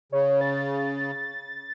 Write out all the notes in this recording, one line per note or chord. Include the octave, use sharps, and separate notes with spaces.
C#3 C#5
A6